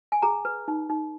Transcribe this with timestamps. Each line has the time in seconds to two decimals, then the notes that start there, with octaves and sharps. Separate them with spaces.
0.12 G#5
0.22 G#4 A#5
0.45 B4
0.68 D#4
0.90 D#4